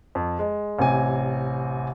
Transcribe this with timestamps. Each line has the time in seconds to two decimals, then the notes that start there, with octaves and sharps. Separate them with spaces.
0.15 F2
0.39 G#3
0.79 A1 C3 G#5